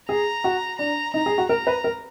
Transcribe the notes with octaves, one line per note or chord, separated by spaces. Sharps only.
G#4 A#5
F#4
D4 A#5
D#4 A#5
G#4
F#4
A#4 A#5
B4
A#4